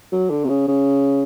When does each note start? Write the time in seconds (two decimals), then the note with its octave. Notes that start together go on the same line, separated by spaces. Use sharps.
0.12 F#3
0.30 D3
0.45 C3
0.49 C#3
0.68 C#3